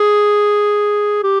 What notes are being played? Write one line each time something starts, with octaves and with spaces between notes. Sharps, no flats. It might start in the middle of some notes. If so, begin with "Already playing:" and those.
Already playing: G#4
G4